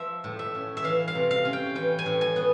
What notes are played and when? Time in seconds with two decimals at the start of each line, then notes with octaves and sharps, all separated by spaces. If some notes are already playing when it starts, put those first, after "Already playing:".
Already playing: F3 E5
0.24 A2
0.39 E5
0.55 C#4
0.77 E5
0.84 E3 F5
1.08 F5
1.15 C3
1.31 F5
1.45 C#4
1.53 G5
1.75 E3 G5
1.99 G#5
2.06 A2
2.21 G#5
2.36 B3